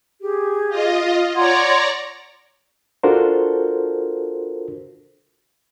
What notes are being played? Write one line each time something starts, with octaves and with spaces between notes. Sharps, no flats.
G4 G#4
F4 D#5
C#5 D5 F#5 A#5 C6 G#6
D4 F4 F#4 A4 A#4 C5